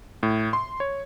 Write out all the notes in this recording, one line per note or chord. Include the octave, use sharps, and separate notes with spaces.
A2
C6
C#5